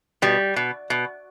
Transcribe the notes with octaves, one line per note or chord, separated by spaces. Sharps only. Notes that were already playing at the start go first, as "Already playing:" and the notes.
B2 G3
B2
B2